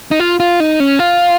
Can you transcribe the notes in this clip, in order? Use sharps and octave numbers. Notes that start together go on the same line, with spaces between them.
D#4
F4
F4
D#4
C#4
F4